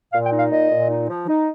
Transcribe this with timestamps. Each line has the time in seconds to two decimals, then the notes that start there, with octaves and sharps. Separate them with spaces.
0.12 A#2 F5
0.25 G5
0.31 D#4
0.38 F5
0.50 A#2 D#5
0.69 A#2
0.89 D#4
1.08 F3
1.27 D#4